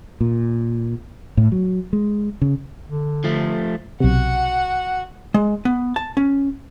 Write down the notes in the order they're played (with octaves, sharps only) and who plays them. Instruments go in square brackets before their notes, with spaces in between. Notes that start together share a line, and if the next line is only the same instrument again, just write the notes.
[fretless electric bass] A#2
A2
F#3
G#3
C#3
[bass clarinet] D3
[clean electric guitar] F3 A3
[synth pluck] B1 C3 [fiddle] F#4 F#5
[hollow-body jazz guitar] G#3
B3
A5
C#4